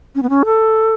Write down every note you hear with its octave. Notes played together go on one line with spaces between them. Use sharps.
C#4
B3
C#4
A4